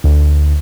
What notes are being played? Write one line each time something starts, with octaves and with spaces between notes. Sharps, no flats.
D2